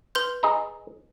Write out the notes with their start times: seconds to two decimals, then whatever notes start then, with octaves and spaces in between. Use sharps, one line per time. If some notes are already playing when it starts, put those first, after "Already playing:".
0.15 B4 C6 G6
0.43 G#4 D#5 A#5